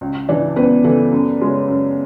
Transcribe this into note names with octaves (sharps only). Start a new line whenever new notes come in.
C#2
C#3 E3 D4 D5
C#2 B3 B4
C#3 E3 A4
F#2
C#3 G#3 C#4
F#2